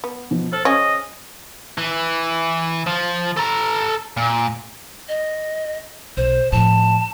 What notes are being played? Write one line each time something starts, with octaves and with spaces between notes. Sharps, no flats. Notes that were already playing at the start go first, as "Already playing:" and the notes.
B3
B2 F3
A4 C5 F6 F#7
C#3 C#4 D#5
E3
F3
A4 A#5
A#2
D#5
B1 C5
A2 F3 A5